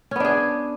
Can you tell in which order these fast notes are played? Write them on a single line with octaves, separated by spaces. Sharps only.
C#4 B3 D4 G#4